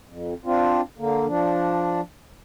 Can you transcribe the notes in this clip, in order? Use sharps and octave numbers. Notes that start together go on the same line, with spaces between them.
F2
C4 D4 F4
D3 A#3
F3 D4